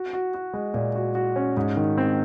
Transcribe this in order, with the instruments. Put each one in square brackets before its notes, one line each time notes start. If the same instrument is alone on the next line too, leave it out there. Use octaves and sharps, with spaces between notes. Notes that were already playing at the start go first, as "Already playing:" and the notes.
Already playing: [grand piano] F#4
F#4
F#4
G#3
A#2
F#4
F#4
C#4
G#2
D#3
C4